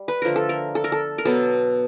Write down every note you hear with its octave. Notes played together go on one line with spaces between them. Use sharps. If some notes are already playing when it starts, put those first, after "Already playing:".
Already playing: G3
B4
D3 F3 A3 A#4
A4
A#4
A4
A#4
A4
A#4
B2 F#3 B3 A4